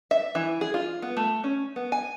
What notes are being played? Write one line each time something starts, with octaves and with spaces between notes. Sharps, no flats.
E5
E3
G#4
F4
B3
A3
C#4
B3
G#5